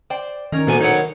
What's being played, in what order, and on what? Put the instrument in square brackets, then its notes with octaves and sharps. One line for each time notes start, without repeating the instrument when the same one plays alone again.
[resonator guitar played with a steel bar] C5 D5 G5
[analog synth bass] D#3 [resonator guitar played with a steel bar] C#4 A#4
[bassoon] D2 [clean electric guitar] A#2 B3 G#5
[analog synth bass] D#3 [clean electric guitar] D#4 C#5 F#5